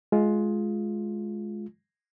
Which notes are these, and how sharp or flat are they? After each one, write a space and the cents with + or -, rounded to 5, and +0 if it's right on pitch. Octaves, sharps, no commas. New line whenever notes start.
G#3 +20 F4 +0